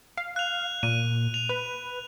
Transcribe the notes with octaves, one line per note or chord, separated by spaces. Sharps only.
F5
F#6 F7
A#2 D#7
F7
B4